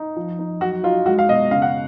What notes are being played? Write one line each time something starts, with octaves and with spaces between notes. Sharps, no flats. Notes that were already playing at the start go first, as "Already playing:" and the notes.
Already playing: D#4
F3
D#4
F#3 F#4
D#4 F4
G#3 F#4
F5
B2 D#5
C#3 F5
F#5